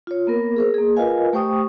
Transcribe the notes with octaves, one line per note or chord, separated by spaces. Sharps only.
F4 C#5
A#3 B3 A#4
G#4 A#4 C5
A#3 G#4
F4 A#4 B4 D#5 F5 G#5
A3 G4 C5 G5 C#6 D#6